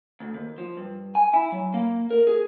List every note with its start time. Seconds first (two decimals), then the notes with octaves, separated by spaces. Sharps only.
0.20 D2
0.34 D#2
0.58 F3
0.77 G2
1.15 G#5
1.33 E4
1.52 F#3
1.74 A#3
2.10 A#4
2.27 G#4